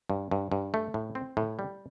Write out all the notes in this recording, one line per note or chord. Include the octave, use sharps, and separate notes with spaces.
G2
G2
G2
A3
A2
C4
A2
G3